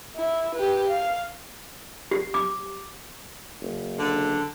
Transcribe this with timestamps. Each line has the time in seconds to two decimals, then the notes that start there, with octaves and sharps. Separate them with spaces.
0.16 E4
0.55 G4 B4
0.88 F5
2.11 G4
2.34 D6
3.62 F#1
3.99 D3